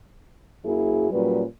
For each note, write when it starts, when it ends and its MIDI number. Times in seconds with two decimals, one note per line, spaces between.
0.65 1.09 42
0.65 1.09 54
0.65 1.09 58
0.65 1.09 64
0.65 1.09 68
1.12 1.43 46
1.12 1.43 54
1.12 1.43 55
1.12 1.43 61
1.12 1.43 71